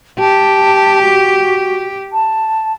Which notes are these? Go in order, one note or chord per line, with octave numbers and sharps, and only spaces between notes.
G4 A5
F#4
A5